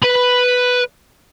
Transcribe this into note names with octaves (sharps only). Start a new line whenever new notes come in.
B4 B5